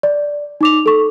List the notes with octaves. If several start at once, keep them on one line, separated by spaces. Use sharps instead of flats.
D5
D#4 D6 F7
A4 C#6